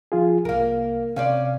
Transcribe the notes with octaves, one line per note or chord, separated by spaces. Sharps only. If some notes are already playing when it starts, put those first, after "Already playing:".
F3 F4 G#4
C2 A#3 A#4 F5
C3 C#4 C5 D5 F5